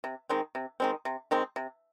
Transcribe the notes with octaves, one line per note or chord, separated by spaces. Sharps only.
C3
D#3 G#3 C4
C3
D#3 G#3 C4
C3
D#3 G#3 C4
C3